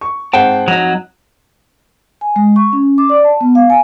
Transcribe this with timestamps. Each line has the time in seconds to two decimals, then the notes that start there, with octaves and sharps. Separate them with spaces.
0.01 C#6
0.33 G#2 C4 C5 F#5 G5 A5
0.68 F2 F#3 D#4
2.21 G#5
2.36 G#3
2.56 C#6
2.73 C#4
2.98 D6
3.09 D5
3.24 A5
3.41 B3
3.55 F5
3.70 G#5